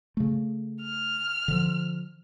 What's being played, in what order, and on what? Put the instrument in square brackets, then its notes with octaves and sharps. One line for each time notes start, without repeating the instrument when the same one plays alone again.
[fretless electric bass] C#3 A3
[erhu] F6
[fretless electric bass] D3 F3